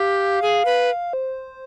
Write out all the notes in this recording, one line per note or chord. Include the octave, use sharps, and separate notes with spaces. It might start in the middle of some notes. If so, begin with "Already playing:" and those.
Already playing: G4 F5
G#4
B4
C5